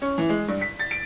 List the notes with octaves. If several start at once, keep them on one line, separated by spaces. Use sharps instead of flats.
C#4
E3
G#3
G2
B6
A6
D7